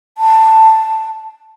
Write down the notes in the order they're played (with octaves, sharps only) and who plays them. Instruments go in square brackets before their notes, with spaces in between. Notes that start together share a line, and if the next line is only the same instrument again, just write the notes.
[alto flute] A5